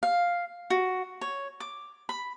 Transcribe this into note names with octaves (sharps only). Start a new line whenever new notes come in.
F5
F#4
C#5
D6
B5